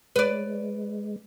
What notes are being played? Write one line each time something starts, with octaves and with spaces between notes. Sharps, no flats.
G#3 B4 D5